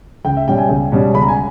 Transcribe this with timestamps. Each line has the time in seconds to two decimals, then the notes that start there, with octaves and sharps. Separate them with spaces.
0.25 C#2 G5
0.37 E5
0.48 B2 G3 C#4 G5
0.58 G#5
0.69 C#2
0.92 B2 G3 C#4
1.14 C#2 B5
1.22 A#5
1.28 G#5